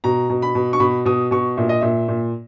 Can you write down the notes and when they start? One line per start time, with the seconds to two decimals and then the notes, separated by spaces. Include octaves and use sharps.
0.04 B2 A#5
0.30 B2
0.42 B5
0.55 B2
0.73 C#6
0.80 B2 B5
1.05 B2 D#6
1.31 B2 C#6
1.57 A#2 E5
1.69 D#5
1.81 A#2 E5
2.08 A#2